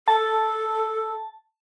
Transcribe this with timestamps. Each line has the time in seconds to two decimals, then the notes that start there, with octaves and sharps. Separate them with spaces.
0.08 A4 A5